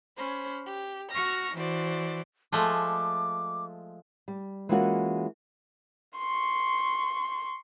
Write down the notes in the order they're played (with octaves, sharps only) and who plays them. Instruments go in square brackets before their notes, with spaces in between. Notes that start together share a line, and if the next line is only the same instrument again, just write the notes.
[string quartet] C#4 C5 B5
G4
F#4 C#6 F6 A#6
E3 F#4 C5 D5
[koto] F3 G#3 A3 [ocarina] D6
[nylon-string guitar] G3
E3 G#3 A#3 C#4 F4 F#4
[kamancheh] C6 C#6